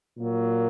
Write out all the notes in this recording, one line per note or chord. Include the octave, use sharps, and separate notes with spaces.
A#2 F#3 A#3